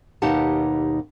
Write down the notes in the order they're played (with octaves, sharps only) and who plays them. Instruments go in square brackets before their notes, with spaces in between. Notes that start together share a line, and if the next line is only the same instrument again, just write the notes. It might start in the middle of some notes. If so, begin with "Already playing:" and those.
[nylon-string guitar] D#2 B2 D#4 G4 F#5 A5